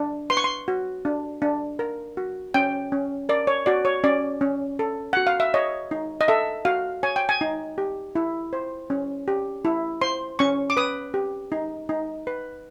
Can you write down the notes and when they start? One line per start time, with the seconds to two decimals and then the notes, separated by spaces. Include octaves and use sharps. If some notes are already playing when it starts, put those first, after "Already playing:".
Already playing: D4
0.30 B4 C6
0.37 C#6
0.44 C6
0.68 F#4
1.05 D4
1.42 D4
1.79 A#4
2.17 F#4
2.54 C#4 G5
2.92 C#4
3.29 A#4 D5
3.47 C#5
3.66 F#4 D5
3.85 C#5
4.04 C#4 D5
4.41 C#4
4.79 A4
5.13 F#4 F#5
5.27 F5
5.40 E5
5.54 C#5 D#5
5.91 D#4
6.21 D#5
6.28 A4 E5
6.65 F#4 F5
7.03 C#5 G#5
7.16 G5
7.29 G#5
7.41 D#4
7.78 G4
8.15 E4
8.53 C5
8.90 C#4
9.28 G4
9.65 E4
10.01 C5 C6
10.39 C#4 C#6
10.70 D6
10.77 B4 D#6
11.14 G4
11.52 D#4
11.89 D#4
12.27 B4